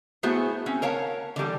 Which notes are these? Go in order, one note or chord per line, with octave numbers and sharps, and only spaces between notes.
A3 B3 E4 F#4 G#4 C5
C4 C#4
A#4 C#5 F5 F#5 A5
D3 E3 G3 D4